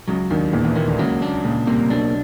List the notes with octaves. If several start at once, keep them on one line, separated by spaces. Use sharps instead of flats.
C#2 C#3 F#3
D#2 D#3 D4
E2 A#2 E3
E2 E3
D#2 D#3 A#3
D2 D3
C#2 C#3 F#3
D4
C#2 A#2 C#3
C2 C3 A#3
B1 B2 D4